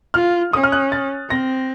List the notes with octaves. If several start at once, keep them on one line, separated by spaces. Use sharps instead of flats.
F4 F6
C#4 D#6
F6
F#6
A6
C4 A#6